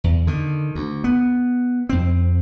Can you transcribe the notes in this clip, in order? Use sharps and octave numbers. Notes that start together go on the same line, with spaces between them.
E2
D3 D#3
D2
B3
F2 C4